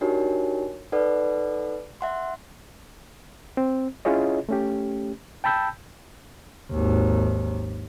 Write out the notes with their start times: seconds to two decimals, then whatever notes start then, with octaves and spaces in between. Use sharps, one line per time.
0.01 D4 D#4 F#4 G4 A#4 C#5
0.92 D#4 A4 B4 D5 F#5
2.01 E5 F#5 C6
3.57 C4
4.05 C#4 E4 F4 G#4 C#5 D#5
4.49 A3 C#4 G4
5.44 G5 A5 B5 E6 G6
6.71 G#1 D#2